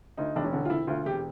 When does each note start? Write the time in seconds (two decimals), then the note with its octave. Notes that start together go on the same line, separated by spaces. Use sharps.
0.17 D2 D#4
0.36 E1 D4
0.45 C#4
0.53 D3
0.65 F4
0.70 E1 E4
0.87 D2 F4
1.05 E1 G4